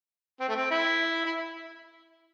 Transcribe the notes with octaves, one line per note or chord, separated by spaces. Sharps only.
C4
A3
C4
E4
E4